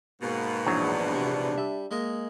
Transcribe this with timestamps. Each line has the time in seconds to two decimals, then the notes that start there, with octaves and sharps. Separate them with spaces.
0.22 G#2 B2 A#3
0.66 A#1 E2 F#3 D4
1.13 C3
1.58 G3 E5
1.91 G#3 A#3 D#5